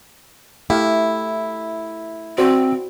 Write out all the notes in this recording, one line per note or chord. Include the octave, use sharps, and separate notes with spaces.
A3 E4 G4 F5
C4 F#4 C5 D5